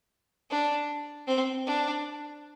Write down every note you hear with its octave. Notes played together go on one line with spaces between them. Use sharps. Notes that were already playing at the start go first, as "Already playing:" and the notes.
D4
C4
D4